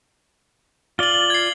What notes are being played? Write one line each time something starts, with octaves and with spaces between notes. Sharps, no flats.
F4 D5 F#7 G7
G#6 C7